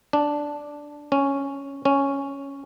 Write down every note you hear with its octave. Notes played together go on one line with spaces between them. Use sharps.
D4
C#4
C#4